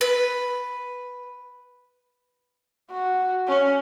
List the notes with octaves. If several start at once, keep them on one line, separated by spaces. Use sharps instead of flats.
B4
F#4
C#4